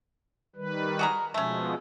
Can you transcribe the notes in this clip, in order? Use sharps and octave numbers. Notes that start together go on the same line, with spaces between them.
D#3 G3 B4
F#4 G#4 A#4
B2 F3 G#3 A3 C#4